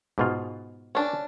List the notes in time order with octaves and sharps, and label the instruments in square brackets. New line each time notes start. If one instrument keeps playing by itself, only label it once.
[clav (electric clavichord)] G#2 B2 F4
[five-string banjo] C#4 D4